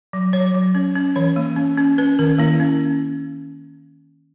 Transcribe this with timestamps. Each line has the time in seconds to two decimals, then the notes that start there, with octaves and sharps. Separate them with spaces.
0.13 F#3
0.33 F#3 C#5
0.55 F#3
0.75 C#4
0.95 C#4
1.16 E3 C#5
1.36 A#3
1.56 C#4
1.77 C#4
1.98 C#4 B4
2.19 D#3 A#4
2.38 A#3 E4
2.60 C#4